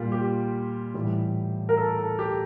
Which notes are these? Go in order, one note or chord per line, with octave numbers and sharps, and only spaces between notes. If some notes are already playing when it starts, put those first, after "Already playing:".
Already playing: A#2 G3 F4
G4
A2 E3 G3
A#4
A4
A4
G4